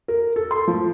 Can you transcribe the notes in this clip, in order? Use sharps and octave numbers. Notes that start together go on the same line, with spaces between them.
A#4
A4
C6
F3